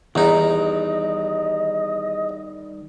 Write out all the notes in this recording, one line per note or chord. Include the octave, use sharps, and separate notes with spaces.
E2 D#3 G3 D#4 D#5